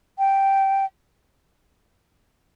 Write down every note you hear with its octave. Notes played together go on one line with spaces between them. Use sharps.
G5